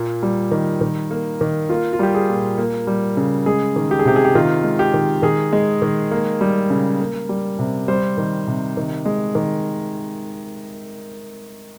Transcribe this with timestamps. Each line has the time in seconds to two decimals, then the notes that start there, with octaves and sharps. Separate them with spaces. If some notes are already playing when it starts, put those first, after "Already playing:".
Already playing: A#2 A#3
0.23 G3
0.52 D#3
0.81 D#3
1.11 A#3
1.41 D#3
1.69 A#3 F4
1.93 F4
1.99 G3 G4
2.15 G#4
2.29 A#2
2.58 A#3
2.87 G3
3.17 C#3
3.46 G#3 G#4
3.76 D#3
3.91 G4
3.99 G#4
4.05 C3 G4
4.16 G#4
4.25 G4
4.35 D#3 F4
4.64 G#3
4.79 G4
4.94 D#3
5.23 D#3 G#4
5.53 G#3
5.82 D#3
6.11 A#3
6.41 G3
6.70 C#3
7.00 A#3
7.29 G3
7.59 C3
7.88 G3 C5
8.18 D#3
8.47 C3
8.77 D#3
9.05 G#3
9.35 D#3